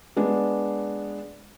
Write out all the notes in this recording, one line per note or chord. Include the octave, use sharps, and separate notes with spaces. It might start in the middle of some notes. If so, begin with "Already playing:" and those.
G#3 B3 D4